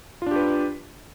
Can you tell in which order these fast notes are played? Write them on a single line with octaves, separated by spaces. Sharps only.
F4 D4 G4 B4